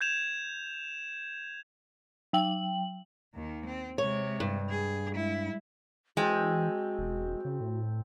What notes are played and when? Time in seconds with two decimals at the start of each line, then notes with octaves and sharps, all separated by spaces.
0.01 G6 G#6 E7 F7
2.33 F#3 G5 F#7
3.35 D#2 D#3
3.66 C4
3.98 C3 G#3 C#5
4.40 G2
4.70 G#4
5.13 G#3 E4
6.17 E3 G#3 C4 F#4 G5 A5
6.99 E1
7.45 C#3
7.61 A2